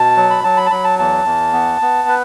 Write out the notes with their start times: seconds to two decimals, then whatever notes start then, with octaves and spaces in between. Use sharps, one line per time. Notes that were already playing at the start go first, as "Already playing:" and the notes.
Already playing: B2 A5
0.16 F#3
0.30 B5
0.44 F#3 A5
0.57 B5
0.66 A5
0.71 F#3 B5
0.84 A5
0.99 E2 A5
1.25 E2
1.53 B3
1.82 B3
2.08 B4